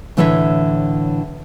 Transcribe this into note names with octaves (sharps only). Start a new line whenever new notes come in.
A2 D3 E3 E4 C#5 E5